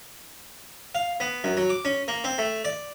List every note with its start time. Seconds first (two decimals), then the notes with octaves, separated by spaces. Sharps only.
0.95 F5
1.20 B3
1.44 F#2
1.57 F#3
1.70 D6
1.85 C#4
2.08 A#3
2.24 C4
2.38 A3
2.65 D5